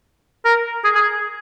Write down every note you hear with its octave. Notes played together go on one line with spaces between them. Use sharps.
A#4
G#4
G#4